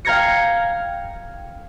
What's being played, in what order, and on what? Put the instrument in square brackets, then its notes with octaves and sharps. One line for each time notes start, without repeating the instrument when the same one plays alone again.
[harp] F5 G5 A#5 G#6 A#6 C#7